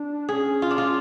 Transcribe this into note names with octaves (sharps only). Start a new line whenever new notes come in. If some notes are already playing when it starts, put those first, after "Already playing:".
Already playing: D4
C#4 G#4
F4
D4
F4